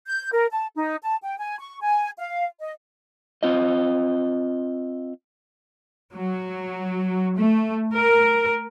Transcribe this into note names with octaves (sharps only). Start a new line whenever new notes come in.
G6
A#4
A5
D#4
A5
G5
G#5
C#6
G#5
F5
D#5
C4 F4 D#5
F#3
A3
A#4